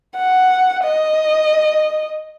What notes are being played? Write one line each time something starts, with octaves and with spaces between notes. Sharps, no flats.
F#5
D#5